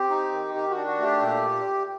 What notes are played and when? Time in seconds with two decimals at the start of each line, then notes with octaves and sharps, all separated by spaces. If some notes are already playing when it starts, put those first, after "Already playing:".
Already playing: C4 G4
0.10 D#4
0.32 D#3
0.54 D#3 G4
0.70 F#4
0.76 D4
0.87 F#4
0.99 A3
1.04 G4
1.20 A#2